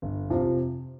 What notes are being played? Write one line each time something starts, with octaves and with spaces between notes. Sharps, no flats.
G1
F2 C3 F3